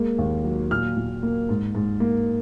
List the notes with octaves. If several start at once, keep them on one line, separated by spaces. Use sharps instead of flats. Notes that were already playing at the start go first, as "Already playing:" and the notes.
Already playing: G#3 A#3
D#2
F#3
A#2 F6
A#2
A#3
G#2
G#2
A#3